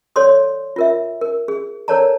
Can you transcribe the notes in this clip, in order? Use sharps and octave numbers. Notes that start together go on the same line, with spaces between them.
A4 C#5 D5 C6 D#6
F4 A#4 E5
A#4
G#4
A4 A#4 C#5 D5 A5 A#5